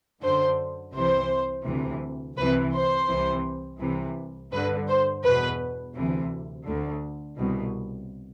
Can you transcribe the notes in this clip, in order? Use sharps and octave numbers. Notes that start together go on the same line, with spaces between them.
F#2 D3 C5
C2 C3 E3 C5
D2 C3 E3
C2 C3 E3 B4
C5
C2 C3 E3
C2 C3 E3
G2 D3 B4
C5
E2 B2 B4
D2 C3 E3
D2 D3
C2 B2